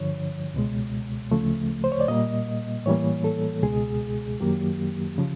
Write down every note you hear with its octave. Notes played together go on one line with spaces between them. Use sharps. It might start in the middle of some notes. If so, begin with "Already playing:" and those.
Already playing: G2 D3 F3 C#5
C#2 B2 G#3
D2 C#3 F3 A3
C5
C#5
D5
A#2 G3 A#3 D#5
A2 E3 G3 A#3 C#5
A4
C#2 B2 G#3 G#4
F#2 D#3 F#3 A#3 G4
C#3 F3